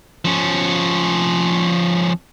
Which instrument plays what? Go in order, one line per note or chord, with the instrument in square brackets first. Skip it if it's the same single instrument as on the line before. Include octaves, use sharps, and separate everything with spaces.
[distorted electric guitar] F3 C#4